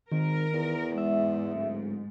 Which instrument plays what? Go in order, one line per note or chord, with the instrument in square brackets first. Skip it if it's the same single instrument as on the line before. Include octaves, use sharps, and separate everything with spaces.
[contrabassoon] G#1 [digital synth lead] D#3 [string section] A#4
[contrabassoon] E2
[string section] G#2 [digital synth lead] E5
[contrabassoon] D1